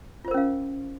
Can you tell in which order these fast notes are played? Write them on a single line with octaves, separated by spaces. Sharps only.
F4 C5 A#4 C#4 F5